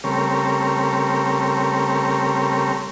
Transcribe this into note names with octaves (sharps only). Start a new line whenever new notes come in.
C#3 G3 A3 C4 A#4 C#5